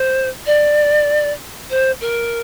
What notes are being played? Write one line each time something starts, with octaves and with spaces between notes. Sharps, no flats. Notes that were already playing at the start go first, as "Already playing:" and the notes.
Already playing: C5
D5
C5
A#4